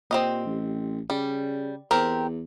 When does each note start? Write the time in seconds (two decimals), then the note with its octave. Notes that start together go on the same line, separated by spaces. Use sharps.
0.11 A#2 C4 G4 D#5
0.45 A1
1.10 C#3 G3
1.91 E2 C4 G4 A#4